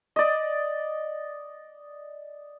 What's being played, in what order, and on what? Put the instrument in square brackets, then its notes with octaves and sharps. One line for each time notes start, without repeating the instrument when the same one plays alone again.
[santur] D5 D#5